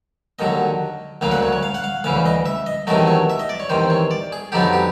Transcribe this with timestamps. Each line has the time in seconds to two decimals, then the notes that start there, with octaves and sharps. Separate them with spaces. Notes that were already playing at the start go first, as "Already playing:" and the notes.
0.39 D#2 D3 F#3 D#5
1.21 D2 C#3 F#3 A#3 F5
1.31 F#5
1.43 C#5
1.53 C#5
1.63 F5
1.74 F#5
1.84 F5
2.04 D2 C#3 E3 F5
2.26 D#5
2.46 E5
2.66 D#5
2.87 E2 C3 D#3 F#3 A3 D#5
3.07 C#5
3.30 E5
3.39 D#5
3.49 D5
3.60 C#5
3.70 E2 C3 D#3 C5
3.90 C#5
4.11 D5
4.32 G#4
4.52 F2 D3 F#3 B3 D#4 G4
4.73 G4